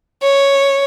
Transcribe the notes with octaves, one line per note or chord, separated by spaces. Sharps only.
C#5